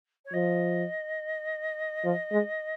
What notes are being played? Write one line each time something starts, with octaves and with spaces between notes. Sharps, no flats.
C#5
F3 D#5
F3
G#3